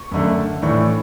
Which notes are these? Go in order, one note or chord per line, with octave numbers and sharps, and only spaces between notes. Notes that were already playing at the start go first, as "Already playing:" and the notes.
Already playing: C#6
F#2 D3 A3
A2 E3 A3 D4 C#6